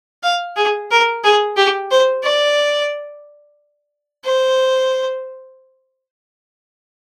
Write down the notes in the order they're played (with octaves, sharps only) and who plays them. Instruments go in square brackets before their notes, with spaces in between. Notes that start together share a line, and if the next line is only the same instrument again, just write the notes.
[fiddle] F5
G#4
A#4
G#4
G4
C5
D5
C5